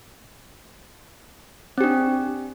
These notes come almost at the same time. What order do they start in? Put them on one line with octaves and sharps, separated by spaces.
C4 G4 D4